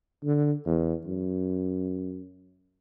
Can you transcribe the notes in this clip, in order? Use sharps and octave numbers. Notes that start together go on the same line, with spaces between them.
D3
E2
F#2